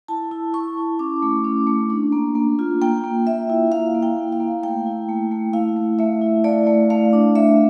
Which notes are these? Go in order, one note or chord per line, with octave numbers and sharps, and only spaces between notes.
E4 A5
E4
E4 C#6
E4
C#4 D6
A3
C#4
A3
D4
A#3
A#3
F4
A#3 G5
A#3
A#3 E5
E4
A#3 F5
A#3
G5
A#3
F5
A#3
A3 G5
E4
A3
A3
E4 F5
A3
A3 E5
E4
A3 D5
A3
A3 F5
D4
A3 E5